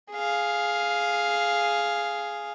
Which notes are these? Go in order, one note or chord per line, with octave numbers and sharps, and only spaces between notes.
G#4 F5